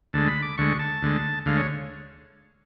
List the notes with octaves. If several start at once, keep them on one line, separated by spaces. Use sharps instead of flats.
D2 D3 G#3 A5
B5
D6
D2 D3 G#3 C#6
A5
D2 D3 G#3
D2 D3 G#3 F5
C#5